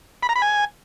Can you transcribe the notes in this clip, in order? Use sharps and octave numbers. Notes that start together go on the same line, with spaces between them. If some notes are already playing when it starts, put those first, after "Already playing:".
B5
A#5
B5
G#5